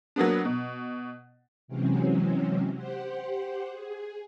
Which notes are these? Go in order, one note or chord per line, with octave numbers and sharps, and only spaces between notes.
F#3 A#3 B3 D4
B2
C3 E3 F#3 G#3 C4 C#4
G4 C5 F#5
G#4